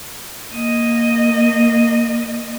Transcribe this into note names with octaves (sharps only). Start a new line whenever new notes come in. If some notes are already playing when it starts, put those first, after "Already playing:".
A#3 D#5